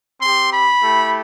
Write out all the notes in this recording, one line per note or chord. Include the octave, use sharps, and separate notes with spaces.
C4 G4 C6
B5
A3 E4 G4